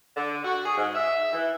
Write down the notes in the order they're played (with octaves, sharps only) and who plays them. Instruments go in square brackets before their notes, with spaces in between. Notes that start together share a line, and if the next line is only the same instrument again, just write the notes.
[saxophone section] D3
F#4
G#4
G#2
E5
E3